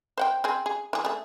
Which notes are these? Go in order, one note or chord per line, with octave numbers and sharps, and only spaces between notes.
C5 F#5 G5
C4 G#4
G#4
E3 G#4
A3 G#4